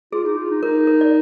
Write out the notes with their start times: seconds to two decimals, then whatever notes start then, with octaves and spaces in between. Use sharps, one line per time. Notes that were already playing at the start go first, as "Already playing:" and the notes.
0.13 F4 G#4
0.26 D#4
0.38 F4
0.50 D#4
0.63 D#4 A#4
0.87 A#4
1.01 D5